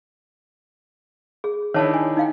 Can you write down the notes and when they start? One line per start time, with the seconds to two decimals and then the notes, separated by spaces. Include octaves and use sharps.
1.44 G#4
1.74 D#3 D4 E4 C#5 A5
1.94 G#5
2.17 D#4 F5 G5